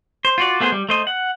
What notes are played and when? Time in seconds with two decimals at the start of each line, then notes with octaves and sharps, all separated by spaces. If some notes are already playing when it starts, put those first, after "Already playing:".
0.25 C5
0.38 F4 F#4 D5
0.60 A3 B3 G#4 C5
0.72 G3
0.89 A3 C5 D#5
1.07 F#5